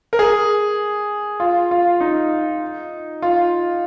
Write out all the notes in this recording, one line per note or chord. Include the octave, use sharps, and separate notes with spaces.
A#4
G#4
F4
F4
D#4
F4